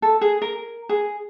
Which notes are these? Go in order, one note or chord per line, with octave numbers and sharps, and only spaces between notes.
A4
G#4
A#4
G#4